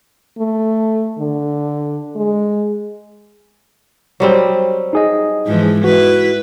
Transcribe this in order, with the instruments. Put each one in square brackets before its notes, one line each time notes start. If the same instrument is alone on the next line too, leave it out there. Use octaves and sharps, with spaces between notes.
[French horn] A3
D3
G#3
[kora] F#3 G3 C4
[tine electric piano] D#4 G#4 D#5
[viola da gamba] G#2 E3 F3
[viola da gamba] E4 B4 [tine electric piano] F#4